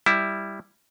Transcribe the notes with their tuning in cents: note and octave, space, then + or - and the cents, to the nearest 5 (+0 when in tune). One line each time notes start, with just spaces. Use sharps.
G3 +10 E4 +0